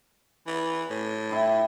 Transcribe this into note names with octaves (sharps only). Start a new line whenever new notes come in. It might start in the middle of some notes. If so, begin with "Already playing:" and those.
E3
A2
E4 G5 C6